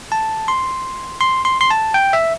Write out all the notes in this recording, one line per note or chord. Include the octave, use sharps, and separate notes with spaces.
A5
C6
C6
C6
C6
A5
G5
E5